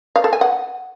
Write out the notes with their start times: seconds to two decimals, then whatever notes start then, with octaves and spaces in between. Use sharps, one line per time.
0.16 F5
0.24 A4
0.33 G#5
0.41 F#5